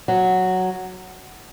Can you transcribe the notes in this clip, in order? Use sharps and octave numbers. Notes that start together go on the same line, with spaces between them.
F#3